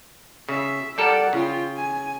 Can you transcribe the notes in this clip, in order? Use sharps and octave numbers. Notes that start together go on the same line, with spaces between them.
C#3 E5
G3 A4 A#4 D5 F#5
C#3 F4 G5
G#5